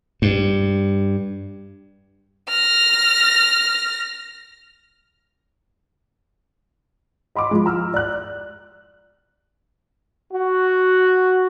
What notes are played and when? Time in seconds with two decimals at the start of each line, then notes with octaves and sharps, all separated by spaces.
0.22 G2
2.49 F6 A#6
7.36 D#5 B5 C6 D6
7.51 F3 G#3
7.66 A#5 E6 F6
7.94 D5 F#6
10.33 F#4